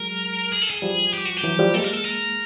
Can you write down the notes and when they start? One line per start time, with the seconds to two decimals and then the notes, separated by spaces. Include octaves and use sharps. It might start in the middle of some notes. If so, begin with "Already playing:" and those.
Already playing: F#3 G#3 A#4
0.52 G#4
0.62 A4
0.70 G#4
0.82 F3 G3
1.14 G4
1.25 F#4
1.37 G4
1.44 E3 F#3
1.59 F3 G3
1.74 G#3 A#3 A4
1.84 A#4
1.93 A4
2.04 A#4